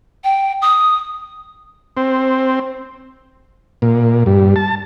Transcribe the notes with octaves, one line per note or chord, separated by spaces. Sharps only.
G5
D#6
C4
A#2
G2
A5